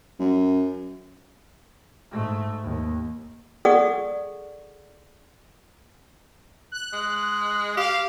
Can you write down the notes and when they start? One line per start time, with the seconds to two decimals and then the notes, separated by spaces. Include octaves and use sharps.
0.20 F#2
2.11 G#2 A3
2.63 D#2
3.65 G#4 A4 D5 F#5 C#6 D#6
6.72 F#6
6.93 G#3
7.77 G4 F5